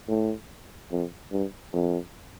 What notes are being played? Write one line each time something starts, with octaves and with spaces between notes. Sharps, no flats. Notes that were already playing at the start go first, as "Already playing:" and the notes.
A2
F2
G2
F2